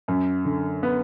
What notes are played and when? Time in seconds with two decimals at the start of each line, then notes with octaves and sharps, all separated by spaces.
0.08 F#2
0.45 D3
0.83 B3